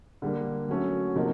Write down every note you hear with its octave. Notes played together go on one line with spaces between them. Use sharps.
D3 G3 A#3
F#3 A3 C#4 F#4 A4
C3 F3 A#3 D#4 F#4